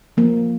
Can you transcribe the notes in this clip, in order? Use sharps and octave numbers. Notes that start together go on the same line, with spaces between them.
F3 A#3